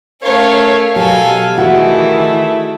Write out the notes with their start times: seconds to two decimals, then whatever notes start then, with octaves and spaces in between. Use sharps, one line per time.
0.22 A3 C#4 A#4 C#5 F5
0.96 B2 F#3 G4 A4 F5 G#5
1.58 D#3 E3 A3 E4 F#4 G#4